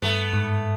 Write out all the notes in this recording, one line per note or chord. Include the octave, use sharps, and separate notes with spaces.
G2 A3 B3
G#2